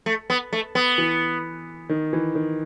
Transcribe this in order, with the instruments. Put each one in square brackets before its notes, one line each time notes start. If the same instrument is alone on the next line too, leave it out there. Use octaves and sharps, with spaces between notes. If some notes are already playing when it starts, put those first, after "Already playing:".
[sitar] A3
B3
A3
B3
[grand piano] E3
D#3
E3
D#3